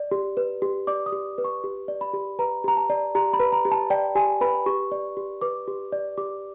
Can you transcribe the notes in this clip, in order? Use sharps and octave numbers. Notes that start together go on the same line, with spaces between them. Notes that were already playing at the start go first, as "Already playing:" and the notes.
Already playing: D5
G4
B4
G4
D5 D6
D#6
G4
B4
C#6
G4
D5
B5
G4
B4 A#5
G4 A#5
A5
D5
G4 A#5
B5
B4
A#5
G4
A5
D5 G5
G4 G#5
B4 B5
G4 C#6
D5
G4
B4 D6
G4
D5
G4 D6